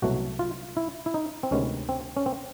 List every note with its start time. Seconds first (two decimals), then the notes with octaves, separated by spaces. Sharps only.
0.02 C2 B2 F#3 A3 F#4
0.39 F4
0.77 E4
1.06 E4
1.14 D#4
1.43 C4
1.51 D2 C3 D#3 G#3 B3 C#4
1.89 C4
2.17 C#4
2.26 C4